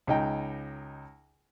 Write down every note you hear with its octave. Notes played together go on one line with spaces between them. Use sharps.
C#2 D#4 G5